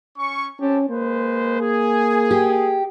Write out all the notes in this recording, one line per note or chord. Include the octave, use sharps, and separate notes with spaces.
C#4 C#6
C4 C#4 G4 A5
G#3 A#3 B4 C5
G#4
G4